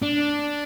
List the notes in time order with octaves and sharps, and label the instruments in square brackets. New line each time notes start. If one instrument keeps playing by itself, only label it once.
[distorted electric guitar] D4